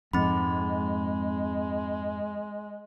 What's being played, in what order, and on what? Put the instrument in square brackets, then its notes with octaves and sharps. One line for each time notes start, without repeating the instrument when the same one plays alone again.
[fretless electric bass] F2 G#2 [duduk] G#3 [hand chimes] C4 B5